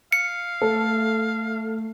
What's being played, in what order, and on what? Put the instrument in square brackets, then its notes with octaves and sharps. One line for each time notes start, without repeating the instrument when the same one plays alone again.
[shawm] F5 [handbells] C#7
[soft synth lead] A3 [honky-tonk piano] A4